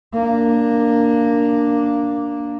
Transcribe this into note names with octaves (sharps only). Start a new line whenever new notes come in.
A#3 D4